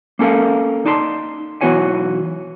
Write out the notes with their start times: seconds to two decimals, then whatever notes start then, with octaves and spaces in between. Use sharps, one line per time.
0.19 A#3 C#4 A4 A#4 F5
0.86 D#4 D5 A5 C6
1.61 B1 E3 B3 F#4 C#5 G#5